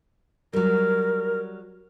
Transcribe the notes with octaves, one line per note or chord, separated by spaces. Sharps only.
F#3 G3 A#4